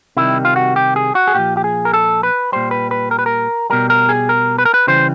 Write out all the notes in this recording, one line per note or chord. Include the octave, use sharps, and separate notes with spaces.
C3 D#3 G3 E4
F4
F#4
G4
G#4
F#4
G#4
A#2 F3 G4
G4
G#4
A#4
A4
B4
A#2 G3 C5
B4
B4
A#4
B4
A#4
B2 G3 A#4
A#4
G#4
A#4
B4
A#4
B4
C#3 E3 G3 C5